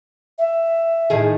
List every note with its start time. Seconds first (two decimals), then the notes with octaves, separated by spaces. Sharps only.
0.39 E5
1.10 A2 D#3 G#4